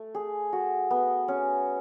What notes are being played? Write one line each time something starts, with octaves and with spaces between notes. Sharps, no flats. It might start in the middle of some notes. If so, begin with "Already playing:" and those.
Already playing: A3
G#4
F#4
B3
C#4